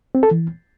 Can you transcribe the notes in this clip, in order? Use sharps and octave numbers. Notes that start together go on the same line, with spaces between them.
C4
A4
E3